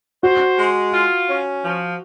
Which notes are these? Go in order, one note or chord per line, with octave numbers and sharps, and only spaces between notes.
F#4 C5
G#3
F4
C#4
F3